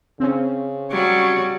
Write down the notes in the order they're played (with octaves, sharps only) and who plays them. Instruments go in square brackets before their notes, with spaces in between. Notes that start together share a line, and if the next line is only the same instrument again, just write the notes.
[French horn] C#3 [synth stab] C4 C#4
[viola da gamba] F#3 G3 [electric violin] C#5